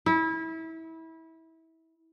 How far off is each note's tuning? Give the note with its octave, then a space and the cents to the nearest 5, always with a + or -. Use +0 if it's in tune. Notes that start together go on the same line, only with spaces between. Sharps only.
E4 -25